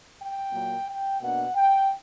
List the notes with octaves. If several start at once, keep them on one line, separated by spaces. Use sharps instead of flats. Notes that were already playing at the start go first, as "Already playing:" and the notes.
G5
A#2 F#3 A#3
G5
B2 A#3 D4 F#5
G5